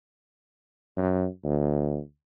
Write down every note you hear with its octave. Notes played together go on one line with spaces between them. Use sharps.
F#2
D2